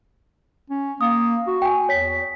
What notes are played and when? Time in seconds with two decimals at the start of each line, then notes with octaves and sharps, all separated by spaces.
0.70 C#4
1.01 A#3 D#6
1.47 F#4
1.62 G5 G#5
1.89 E2 C#5 B6